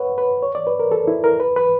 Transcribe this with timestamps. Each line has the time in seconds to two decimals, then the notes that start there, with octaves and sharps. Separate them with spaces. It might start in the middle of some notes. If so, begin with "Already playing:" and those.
Already playing: B4 C#5 F#5
0.18 B4
0.43 C#5
0.55 D5
0.67 B4
0.79 A#4
0.92 A4
1.08 E4
1.24 A#4
1.40 B4
1.56 B4